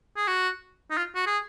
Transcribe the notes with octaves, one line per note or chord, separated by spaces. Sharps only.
G#4
F#4
D#4
F4
F#4
G#4